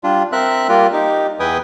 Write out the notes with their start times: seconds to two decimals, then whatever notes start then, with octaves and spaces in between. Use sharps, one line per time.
0.04 G3 D4 F4
0.32 C4 A#4 E5 F#6
0.69 G3 A#3 F4 A#4
0.93 D#4 G4
1.40 E2 E3 B4 G5 G#5 D#6